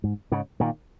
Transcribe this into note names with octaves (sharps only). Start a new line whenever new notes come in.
G#2
G#2 C#3
A#2 D#3